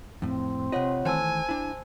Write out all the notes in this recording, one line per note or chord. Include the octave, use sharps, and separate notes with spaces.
F2 A2 C4
C3 F4 C#5 D#5 F#5
D#3 E3 A3 C5 G#5 A5 E6
D4 E4